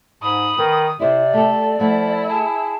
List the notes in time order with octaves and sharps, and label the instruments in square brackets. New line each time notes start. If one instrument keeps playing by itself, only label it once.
[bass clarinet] G#2 [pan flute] B5 [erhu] D#6
[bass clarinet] D#3 [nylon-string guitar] B4
[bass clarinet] C3 [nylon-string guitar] E4 C5 [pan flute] D5
[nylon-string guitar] A3 G4 [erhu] A4
[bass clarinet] F3 [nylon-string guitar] A3 F#5 [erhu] E4
[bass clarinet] G#4 [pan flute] A5